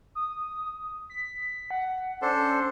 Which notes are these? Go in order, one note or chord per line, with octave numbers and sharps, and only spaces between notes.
D#6
B6
F#5
C#4 D4 A4 C5